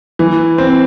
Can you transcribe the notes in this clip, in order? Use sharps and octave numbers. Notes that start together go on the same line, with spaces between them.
E3
C4